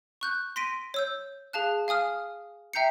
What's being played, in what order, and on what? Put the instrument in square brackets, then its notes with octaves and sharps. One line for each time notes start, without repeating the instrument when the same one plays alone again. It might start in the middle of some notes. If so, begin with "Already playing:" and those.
[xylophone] C#6 F#6 G6
C6 A#6 B6 D7 D#7
C#5 E6 G6
G#4 F5 A5 F#6
F5 G#5 D#6 F6
E5 G5 A#5 G6 C7 C#7